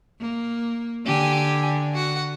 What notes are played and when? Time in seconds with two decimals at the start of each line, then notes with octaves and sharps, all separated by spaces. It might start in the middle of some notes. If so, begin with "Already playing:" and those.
0.21 A#3
1.06 D3 G4 G#5
1.94 F#4 F#5